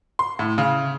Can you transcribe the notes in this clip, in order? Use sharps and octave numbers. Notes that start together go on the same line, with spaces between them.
C6
A2
C#3